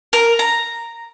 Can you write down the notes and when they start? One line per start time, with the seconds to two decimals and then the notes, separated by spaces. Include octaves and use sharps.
0.13 A#4
0.39 A#5